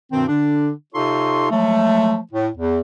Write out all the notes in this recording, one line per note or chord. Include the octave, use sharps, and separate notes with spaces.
G2 B2 D#3 C4
D3 D4
C3 D#4 F4 A4 C#5 C6
F3 F#3 G#3 A3
A2
E2